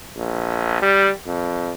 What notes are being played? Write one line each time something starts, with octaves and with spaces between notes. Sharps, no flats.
A#1
G3
F2